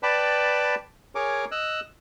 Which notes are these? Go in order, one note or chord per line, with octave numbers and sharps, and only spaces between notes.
B4 D5 G5 A5 B5
G#4 A#4 C#5 G#5 D6
D#5 E6 F#6